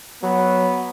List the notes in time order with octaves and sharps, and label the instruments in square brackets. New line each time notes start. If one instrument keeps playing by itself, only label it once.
[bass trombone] F#3 [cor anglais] B3